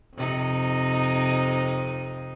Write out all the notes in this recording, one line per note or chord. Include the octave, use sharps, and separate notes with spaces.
F2 C3 D#4